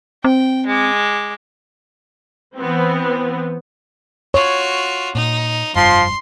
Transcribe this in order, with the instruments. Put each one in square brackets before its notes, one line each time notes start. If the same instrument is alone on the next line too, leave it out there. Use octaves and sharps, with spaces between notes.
[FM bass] C4 [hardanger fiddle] G5
[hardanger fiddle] G#3 D6
[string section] E3 B3 C4
[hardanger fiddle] F4 F#4 [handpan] C#5
[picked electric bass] A#2 [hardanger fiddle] D#4
[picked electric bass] F1 G2 [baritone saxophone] F3 [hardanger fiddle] C6